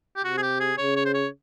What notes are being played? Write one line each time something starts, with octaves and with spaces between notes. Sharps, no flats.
G4
C3 F#4
G#4
G4
G#4
C#3 C#5
C#5
C5
C#5